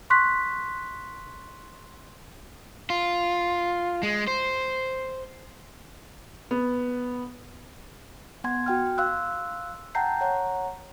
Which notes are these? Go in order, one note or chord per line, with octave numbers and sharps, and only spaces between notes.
C6 C#6 F#6 B6
F4
G#3
C5
B3
B3 F#5 G#5 C6 G#6
F#4 G5 F6
F5 C6 E6 F#6
F#5 G5 A5 A#5 G6 C7
C#5 F#5 A#5